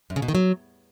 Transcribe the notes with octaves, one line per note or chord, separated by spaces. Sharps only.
F#2
C#3
B2
D#3
F#3